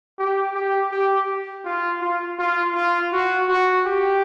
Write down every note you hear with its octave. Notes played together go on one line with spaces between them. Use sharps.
G4
G4
G4
F4
F4
F4
F4
F#4
F#4
G4